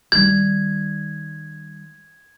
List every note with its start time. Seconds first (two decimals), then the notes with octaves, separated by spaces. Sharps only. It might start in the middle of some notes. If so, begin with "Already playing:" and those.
0.12 D#3 G3 G#6